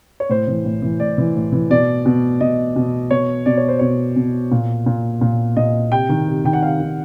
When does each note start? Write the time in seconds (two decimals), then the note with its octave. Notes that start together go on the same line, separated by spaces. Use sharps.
0.20 C#5
0.30 A2 C5
0.48 E3
0.65 A2
0.82 E3
1.00 A2 D5
1.18 E3
1.36 A2
1.52 E3
1.70 B2 D5
2.06 B2
2.41 B2 D#5
2.76 B2
3.10 B2 C#5
3.46 B2 D5
3.57 C#5
3.68 C5
3.79 B2 C#5
4.16 B2
4.52 A#2
4.86 A#2
5.21 A#2
5.57 A#2 D#5
5.91 C3 G5
6.09 D#3
6.27 C3
6.45 D#3 G5
6.53 F#5
6.62 C3 F5
6.80 D#3